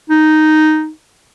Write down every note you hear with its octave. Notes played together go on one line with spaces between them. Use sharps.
D#4